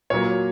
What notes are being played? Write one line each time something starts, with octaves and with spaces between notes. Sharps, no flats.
A#2 F#3 A#3 C#5